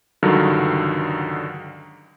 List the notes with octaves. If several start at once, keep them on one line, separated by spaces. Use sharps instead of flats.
C#2 G2 D3 D#3 F#3